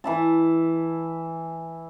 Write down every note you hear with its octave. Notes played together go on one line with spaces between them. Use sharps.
E3 E4 A5